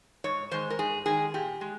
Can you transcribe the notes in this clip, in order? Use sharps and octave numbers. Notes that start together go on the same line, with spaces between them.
G#2 C#5
D#3 G#3 C5
A#4
G#2 G#4
D#3 G#3 G#4
A#2 G4
G#3